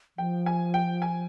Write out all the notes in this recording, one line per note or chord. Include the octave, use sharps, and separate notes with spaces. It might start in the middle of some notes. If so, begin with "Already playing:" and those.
F3 G5
G#5
G5
G#5